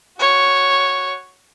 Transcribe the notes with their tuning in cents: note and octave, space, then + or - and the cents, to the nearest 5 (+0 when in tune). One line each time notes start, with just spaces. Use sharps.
F#4 +0 C#5 +0